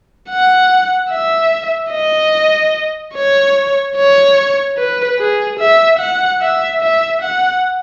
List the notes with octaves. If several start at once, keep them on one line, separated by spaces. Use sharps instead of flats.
F#5
E5
D#5
C#5
C#5
B4
G#4
E5
F#5
E5
E5
F#5